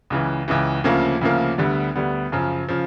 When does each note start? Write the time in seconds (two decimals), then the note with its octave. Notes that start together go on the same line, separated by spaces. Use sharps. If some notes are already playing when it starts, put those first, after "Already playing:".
0.10 C#2 C#3 E3
0.48 C#2 C#3 E3
0.84 D2 C#3 F3 A#3
1.21 D2 C#3 F3 A#3
1.58 D2 D3 G3 B3
1.96 D2 D3 G3 B3
2.32 F#2 C#3 F3
2.68 C#3 F3